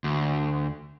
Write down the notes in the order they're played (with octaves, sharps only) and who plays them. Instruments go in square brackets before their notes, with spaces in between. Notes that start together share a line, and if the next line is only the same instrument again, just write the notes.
[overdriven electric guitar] D2